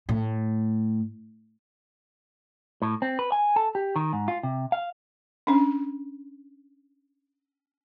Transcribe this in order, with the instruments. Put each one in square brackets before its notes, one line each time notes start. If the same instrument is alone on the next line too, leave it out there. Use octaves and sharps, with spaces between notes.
[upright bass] A2
[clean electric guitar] A2
C4
B4
G#5
A4
G4
D#3
G#2
F4
C3
F5
[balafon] C#4 D4